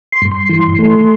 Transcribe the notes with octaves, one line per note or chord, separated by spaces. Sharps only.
C6
G2
C6
E3
A3